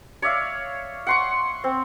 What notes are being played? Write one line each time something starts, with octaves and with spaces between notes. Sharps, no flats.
C#5 D5 E5 F5
F#5 C6 C#6
C4